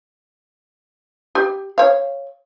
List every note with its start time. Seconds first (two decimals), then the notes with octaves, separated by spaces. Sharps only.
1.35 G4
1.78 C#5 F5